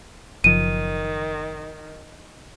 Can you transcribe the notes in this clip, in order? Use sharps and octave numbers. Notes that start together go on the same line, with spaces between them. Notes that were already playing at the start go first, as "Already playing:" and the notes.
F#1 D#3 F3 D#7